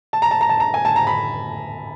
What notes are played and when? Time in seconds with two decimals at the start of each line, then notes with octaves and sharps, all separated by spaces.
0.13 A5
0.22 A#5
0.31 A5
0.41 A#5
0.49 A5
0.60 A#5
0.74 G#5
0.85 A5
0.96 A#5
1.07 B5